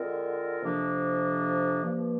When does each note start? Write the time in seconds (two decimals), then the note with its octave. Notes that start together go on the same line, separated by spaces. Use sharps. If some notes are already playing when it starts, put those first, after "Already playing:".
Already playing: D3 G#3 C4 F4 A#4
0.60 F2 C3 F3 A#3 D4
1.82 G2 F3 A#3